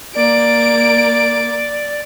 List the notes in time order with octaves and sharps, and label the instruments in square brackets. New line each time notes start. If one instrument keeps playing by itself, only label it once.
[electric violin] A#3 D7 [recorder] D5